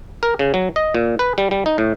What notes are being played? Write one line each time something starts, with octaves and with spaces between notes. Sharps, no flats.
A#4
C#3
F#3
D#5
A#2
B4
G3
G3
D#4
A2